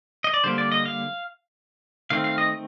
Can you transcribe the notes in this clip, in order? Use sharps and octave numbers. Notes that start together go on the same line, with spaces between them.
D#5
D5
D3 G3 A#3 C5
D5
D#5
F5
D#3 A3 C4 F5
F5
D#5